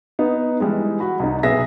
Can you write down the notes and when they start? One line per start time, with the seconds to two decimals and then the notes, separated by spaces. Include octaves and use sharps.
0.19 B3 D#4
0.60 E3 G3 G#3
1.00 F#4 B5
1.19 C2 D#4
1.43 B1 B3 G#4 E5 A#6